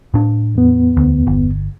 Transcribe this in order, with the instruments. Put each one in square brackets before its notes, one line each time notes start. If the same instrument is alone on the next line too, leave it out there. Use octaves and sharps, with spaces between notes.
[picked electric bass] A2 D4
[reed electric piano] E2 B3
[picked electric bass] D2
G1